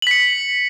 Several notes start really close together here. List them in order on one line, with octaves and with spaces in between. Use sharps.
F#7 B6 C#7